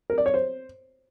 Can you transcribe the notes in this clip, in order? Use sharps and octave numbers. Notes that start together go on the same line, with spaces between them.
A#4
D5
C#5
C5